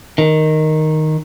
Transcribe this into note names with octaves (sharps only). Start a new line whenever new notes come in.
D#3